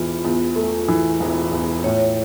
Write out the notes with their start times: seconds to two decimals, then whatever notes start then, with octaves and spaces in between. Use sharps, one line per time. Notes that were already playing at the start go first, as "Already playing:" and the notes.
Already playing: E1 E3 F4
0.25 E2
0.56 A3
0.88 E3
1.20 E1
1.52 E2
1.84 A2 C#5